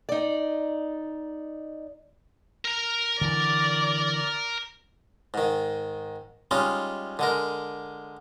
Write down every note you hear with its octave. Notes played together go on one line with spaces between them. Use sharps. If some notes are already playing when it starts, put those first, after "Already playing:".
D#4 D5
A#4 A#5
D3 E3 D5
G#2 D#3
G3 G#3 C#4 D#4 F4
D3 G#3 A#4